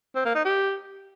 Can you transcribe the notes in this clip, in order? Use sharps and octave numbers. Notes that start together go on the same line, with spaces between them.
C4
A#3
D#4
G4